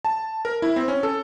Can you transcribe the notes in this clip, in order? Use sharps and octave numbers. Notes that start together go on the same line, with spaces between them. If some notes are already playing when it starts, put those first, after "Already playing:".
A5
A#4
E4
C4
C#4
A4